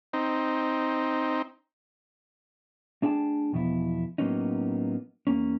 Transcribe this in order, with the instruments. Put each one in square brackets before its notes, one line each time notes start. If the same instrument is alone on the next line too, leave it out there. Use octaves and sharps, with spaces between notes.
[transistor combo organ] C4 D#4
[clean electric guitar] A3 D4 G#4 G5 A5
B1 E2 B2 F3 E4
A2 F#3 A#3 B3 C#4 D#4
E2 A#3 C#4